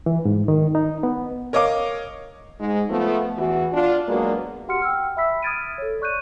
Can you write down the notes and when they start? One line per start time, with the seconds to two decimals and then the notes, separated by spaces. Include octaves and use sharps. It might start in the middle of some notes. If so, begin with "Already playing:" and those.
0.06 E3
0.25 G#2
0.48 D#3
0.75 D#4
1.03 B3
1.53 A#4 C#5 D#5 F5 D6
2.60 G#2 G#3
2.89 F3 A3 B3
3.36 E2 E3 F#4
3.72 D4 F4
4.08 F#3 G#3 A#3 B3 D4 F#4
4.68 F#4 G4 F#5 C6 F6 C#7
4.82 G5 E6 F6
5.17 E5 B5 E6 B6
5.43 D#6 F6 G#6 A6 D7 D#7
5.78 A4 C#5
6.01 D5 C#6 F#6 G6 D#7